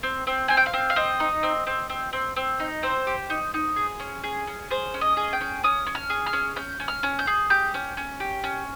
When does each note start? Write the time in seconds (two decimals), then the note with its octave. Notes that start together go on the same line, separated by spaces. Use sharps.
0.03 C4
0.27 C4
0.48 C4 G#5
0.57 G5
0.66 F5
0.73 C4
0.90 F5
0.96 C4 D#5
1.20 D#4
1.43 C4
1.67 C4
1.90 C4
2.13 C4
2.36 C4
2.60 D#4
2.83 C4 C5
3.07 G4
3.30 D#4
3.54 D#4
3.76 G#4
4.00 C#4
4.24 G#4
4.47 C#4
4.70 G#4 C5
4.94 C#4
5.01 D#5
5.17 G#4
5.33 G5
5.41 C#4
5.64 C#4 D#6
5.87 C#4
5.95 F6
6.10 G#4
6.26 F6
6.33 C#4
6.56 C#4 G6
6.80 C#4
6.88 F6
7.03 C#4
7.19 G6
7.27 G#4
7.50 G4 G6
7.74 C#4
7.97 C#4
8.20 G4
8.44 C#4